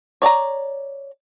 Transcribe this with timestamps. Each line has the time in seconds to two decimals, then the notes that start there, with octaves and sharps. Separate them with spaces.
0.22 C#5 D5 A5 A#5